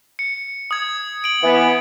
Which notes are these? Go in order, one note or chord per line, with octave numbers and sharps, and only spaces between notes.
C#7
D#6 G#6
D7 F#7
E3 B3